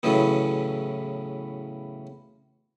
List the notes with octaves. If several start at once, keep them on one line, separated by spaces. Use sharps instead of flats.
E2 A2 C#3 E3 F#3 B3